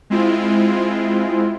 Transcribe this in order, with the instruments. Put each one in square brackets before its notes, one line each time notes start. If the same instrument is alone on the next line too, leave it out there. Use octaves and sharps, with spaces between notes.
[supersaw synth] G#3 C4 E4 F4